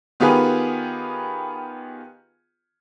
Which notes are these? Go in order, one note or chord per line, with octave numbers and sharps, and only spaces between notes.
D#3 B3 F4 G4 G#4 B4